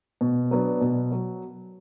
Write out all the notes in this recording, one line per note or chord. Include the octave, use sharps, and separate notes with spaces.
B2
F#3 B3 D4
B2
F#3